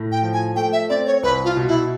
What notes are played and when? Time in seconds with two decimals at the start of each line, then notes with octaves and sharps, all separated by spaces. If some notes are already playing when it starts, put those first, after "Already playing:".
Already playing: A2
0.12 G5
0.23 F3
0.33 G#5
0.56 A3 G5
0.73 E5
0.89 C4 D5
1.06 C#5
1.23 C2 B4
1.44 F4
1.56 B2
1.68 E4